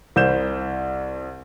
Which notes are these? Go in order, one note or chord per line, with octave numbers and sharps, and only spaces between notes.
C2 C5 G6 E7